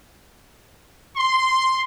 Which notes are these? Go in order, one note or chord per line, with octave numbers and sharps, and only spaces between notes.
C6